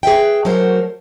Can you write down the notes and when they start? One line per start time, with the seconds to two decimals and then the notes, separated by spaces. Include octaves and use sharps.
0.03 G#4 B4 E5 G5
0.45 F#3 G#3 A3 F#4 A#4 C5